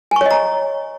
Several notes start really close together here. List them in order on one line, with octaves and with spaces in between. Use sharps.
G#5 C#6 C#5 D#5 A#5